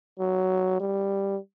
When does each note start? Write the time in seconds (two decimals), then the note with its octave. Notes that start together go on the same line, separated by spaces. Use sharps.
0.19 F#3
0.80 G3